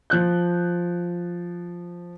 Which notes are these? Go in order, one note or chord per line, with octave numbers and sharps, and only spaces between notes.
F3 F#6 G6